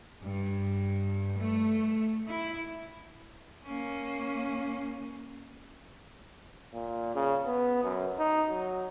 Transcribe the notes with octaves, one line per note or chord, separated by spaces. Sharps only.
G2
A3
E4
A#3 C#4
A#2
C#3
B3
F#2
D#4
F#3